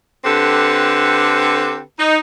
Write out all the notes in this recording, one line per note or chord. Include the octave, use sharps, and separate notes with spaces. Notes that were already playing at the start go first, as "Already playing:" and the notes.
D3 C4 G4 A4 B4
D#4